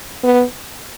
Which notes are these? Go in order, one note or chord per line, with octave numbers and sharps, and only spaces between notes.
B3